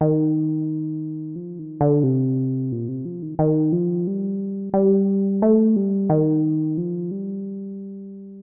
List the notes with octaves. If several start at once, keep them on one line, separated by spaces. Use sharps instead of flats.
D#3
F3
D#3
D3
C3
A#2
C3
F3
D#3
D#3
F3
G3
G3
A3
G3
D#3
F3
G3